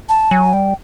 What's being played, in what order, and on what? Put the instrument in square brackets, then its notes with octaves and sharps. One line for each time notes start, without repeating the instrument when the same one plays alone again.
[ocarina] A5
[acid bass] F#3 [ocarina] G#5
[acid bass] G3 [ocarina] G5